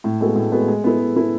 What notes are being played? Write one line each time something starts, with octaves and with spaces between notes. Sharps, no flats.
A2
G#3 B3 F#4 A4
A2
G#3 B3 F#4 A4
G#3
B3 E4 A4
G#3
B3 E4 A4